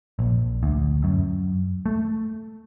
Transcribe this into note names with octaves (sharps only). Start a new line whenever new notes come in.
A#1
D2
F#2
A3